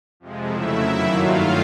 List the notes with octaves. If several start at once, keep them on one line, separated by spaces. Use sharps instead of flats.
F2 C3 F3 G#3
F2 C#3 F#3 A3 E4 E5
F#2 D#3 F#3 A#3 E4 E5
G2 D#3 F#3 A3 F4 F5